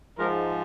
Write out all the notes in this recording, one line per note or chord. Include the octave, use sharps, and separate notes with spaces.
G#2 F3 A#4